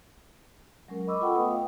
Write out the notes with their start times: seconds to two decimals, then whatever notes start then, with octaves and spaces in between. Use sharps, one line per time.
0.88 F#3 G#3 C#4 A#4
1.07 D#5 B5 C#6 D6 E6
1.21 F4 A4 F#5 G5 B5 C#6
1.35 A3 B3 B4 D#5 G5 D#6
1.51 F5